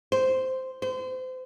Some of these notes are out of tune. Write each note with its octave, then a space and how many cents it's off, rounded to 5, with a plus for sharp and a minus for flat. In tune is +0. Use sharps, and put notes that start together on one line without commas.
C5 -5
C5 -30